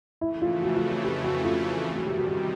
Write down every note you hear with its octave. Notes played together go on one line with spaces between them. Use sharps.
F2 C#3 E3 A3 E4
F4
F#4
F4
F#4
G4
F#4
F4
E2 C3 D#3 G3
F#4
G4
F#4
G4